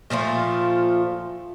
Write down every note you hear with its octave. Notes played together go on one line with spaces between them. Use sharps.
A#2 F3 A3 F4